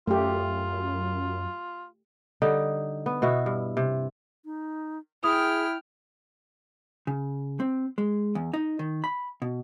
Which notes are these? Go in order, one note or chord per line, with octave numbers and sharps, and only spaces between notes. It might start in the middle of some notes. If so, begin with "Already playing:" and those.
F#2 A3 F4 G4
D3 G3 D#4
B3
B2 E4 F#4
G2
C3
D#4
E4 G#4 G5 D#6 F6
C#3
C4
G#3
E2
D#4
D#3
B5
B2